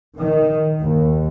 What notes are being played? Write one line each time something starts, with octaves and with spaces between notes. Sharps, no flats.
D#3
D#2